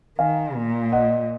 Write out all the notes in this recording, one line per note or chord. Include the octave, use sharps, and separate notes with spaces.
D#3 F5 G#5
A#2
D#5 F#5